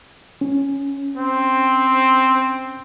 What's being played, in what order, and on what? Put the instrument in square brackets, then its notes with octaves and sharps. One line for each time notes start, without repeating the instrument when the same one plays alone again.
[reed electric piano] C#4
[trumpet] C4